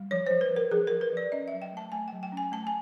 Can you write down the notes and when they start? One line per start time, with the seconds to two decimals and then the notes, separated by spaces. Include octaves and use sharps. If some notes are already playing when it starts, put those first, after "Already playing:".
Already playing: G3
0.11 F3 C#5
0.27 F3 C5
0.41 B4
0.51 F3
0.56 A#4
0.71 F3 G#4
0.87 F3 A#4
1.01 B4
1.12 F3 D5
1.32 C#4 D#5
1.48 E5
1.53 F#3
1.62 G5
1.73 A3 A5
1.92 A3 G#5
2.08 G5
2.13 F#3
2.23 G5
2.32 C#4
2.37 G#5
2.52 A3 A5
2.67 G#5